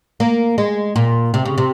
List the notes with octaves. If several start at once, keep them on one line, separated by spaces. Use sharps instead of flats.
A#3
G#3
A#2
C3
C#3
C3